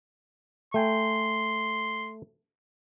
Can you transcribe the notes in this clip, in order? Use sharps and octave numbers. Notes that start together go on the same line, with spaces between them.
A3 G5 G#5 C6